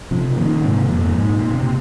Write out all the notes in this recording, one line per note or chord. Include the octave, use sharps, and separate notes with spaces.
C3 F3
A#2 D#3
G#2 C3
F2 A#2
A#2
G#2
A#2
C3